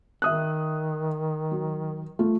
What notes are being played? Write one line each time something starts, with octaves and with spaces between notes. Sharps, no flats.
D#3 E5 D#6 F#6
F#3
A3 F4